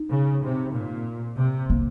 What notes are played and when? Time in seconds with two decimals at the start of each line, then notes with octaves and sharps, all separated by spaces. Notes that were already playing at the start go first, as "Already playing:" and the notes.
Already playing: D#4
0.11 C#3
0.44 C3
0.75 A#2
1.38 C3
1.70 A#3